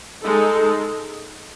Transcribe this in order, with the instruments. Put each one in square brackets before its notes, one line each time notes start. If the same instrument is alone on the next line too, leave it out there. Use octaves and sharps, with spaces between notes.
[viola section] G#3 D#4 A4